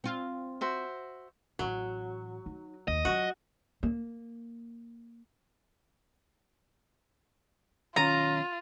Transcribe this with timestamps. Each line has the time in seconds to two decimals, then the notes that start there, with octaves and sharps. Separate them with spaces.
0.04 C4 F4
0.61 F#4 C5 E5
1.59 A1 F#3
2.46 D#4
2.88 D#2 D#5
3.05 F#3 F4 F#4
3.83 A#3
7.96 B1 D#3 C#4 F4 A#5 A6 D#7 F7